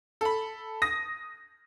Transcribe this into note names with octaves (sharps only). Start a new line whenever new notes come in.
A4 B5
D#6 A#6